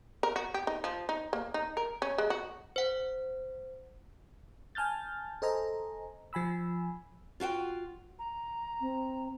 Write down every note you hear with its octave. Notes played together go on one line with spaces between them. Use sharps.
A#4
F#4
G4
D#4
F3
D#4
A#3
D#4
A#4
C#4
G#3
F#4
C5 F#5
G#5 A5 F6 G6 A6
A4 C5 D#5 G#5 A#5
F3 G#5 B5 E6
F4 F#4 F#5 G5
A#5
C4